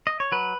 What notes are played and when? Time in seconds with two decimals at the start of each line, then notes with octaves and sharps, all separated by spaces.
0.07 D#5
0.20 C#5
0.32 F#3 B4